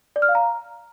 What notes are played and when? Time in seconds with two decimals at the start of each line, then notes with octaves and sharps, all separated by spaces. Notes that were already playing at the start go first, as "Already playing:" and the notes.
0.16 D5
0.22 F6
0.29 F5
0.35 A#5